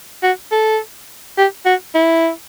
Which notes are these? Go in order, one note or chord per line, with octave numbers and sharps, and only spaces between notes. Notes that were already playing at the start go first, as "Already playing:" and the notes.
F#4
A4
G4
F#4
E4